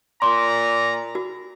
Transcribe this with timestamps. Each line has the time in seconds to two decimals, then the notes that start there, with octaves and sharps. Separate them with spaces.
0.22 A#2 D5 A#5 C6
1.15 F#4